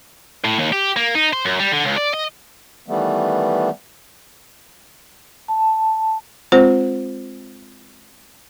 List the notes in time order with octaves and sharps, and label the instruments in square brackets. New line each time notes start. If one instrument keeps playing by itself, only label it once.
[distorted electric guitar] A2
D#2
G4
A#3
D#4
C5
F#2
G3
D3
C#2
D5
D#5
[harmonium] D#3 E3 G3 A3 B3
[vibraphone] A5
[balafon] G#3 C4 F4 C5